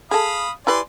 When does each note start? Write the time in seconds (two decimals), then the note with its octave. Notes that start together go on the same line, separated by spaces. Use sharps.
0.11 G#4 A4 F5 B5 D#6
0.67 E4 G4 B4 D5 G#5 C6